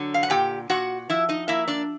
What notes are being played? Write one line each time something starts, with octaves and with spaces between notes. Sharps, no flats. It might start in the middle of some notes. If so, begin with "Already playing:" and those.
Already playing: D3 F#3
F5
F#5
A#2 G4 G5
A#2 F#4 F#5
F3 E4 E5
D#4 D#5
A#3 E4 E5
D4 D5